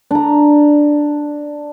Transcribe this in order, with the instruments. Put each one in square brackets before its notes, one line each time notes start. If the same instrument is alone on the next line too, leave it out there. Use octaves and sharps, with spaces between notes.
[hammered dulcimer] D4 A#5